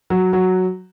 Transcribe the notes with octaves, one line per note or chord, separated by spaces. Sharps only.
F#3
F#3